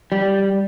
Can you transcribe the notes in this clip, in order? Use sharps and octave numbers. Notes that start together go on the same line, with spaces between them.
G3